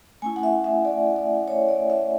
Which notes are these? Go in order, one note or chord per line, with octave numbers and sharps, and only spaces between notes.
A3 C#4 E4 G#5
F#5
E5
E5
D5
D5
C#5
D5
E5